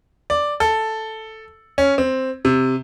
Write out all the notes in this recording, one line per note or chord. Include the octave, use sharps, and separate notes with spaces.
D5
A4
C#4
C4
C3